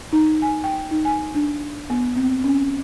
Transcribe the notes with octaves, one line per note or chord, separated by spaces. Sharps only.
D#4
G#5
G5
D#4
G#5
D4
B3
C4
C#4